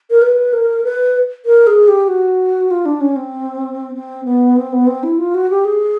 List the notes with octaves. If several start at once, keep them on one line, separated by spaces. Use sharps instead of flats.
A#4
B4
A#4
B4
A#4
G#4
G4
F#4
F4
D4
C#4
C4
C4
B3
C4
B3
C4
E4
F4
F#4
G4
G#4